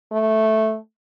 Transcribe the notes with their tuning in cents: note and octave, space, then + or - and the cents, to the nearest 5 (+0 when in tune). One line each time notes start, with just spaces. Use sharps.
A3 -5